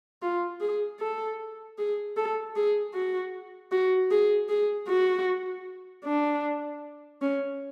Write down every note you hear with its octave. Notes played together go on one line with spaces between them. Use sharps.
F4
G#4
A4
G#4
A4
G#4
F#4
F#4
G#4
G#4
F#4
D4
C#4